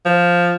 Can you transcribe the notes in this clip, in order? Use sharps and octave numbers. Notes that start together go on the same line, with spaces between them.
F3